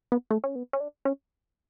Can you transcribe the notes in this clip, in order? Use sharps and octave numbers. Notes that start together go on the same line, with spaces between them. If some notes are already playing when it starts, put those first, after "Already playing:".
B3
A3
C#4
B3
C#4
D4
C#4